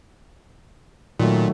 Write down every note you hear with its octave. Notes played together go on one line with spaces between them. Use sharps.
A#2 D#3 F#3 A3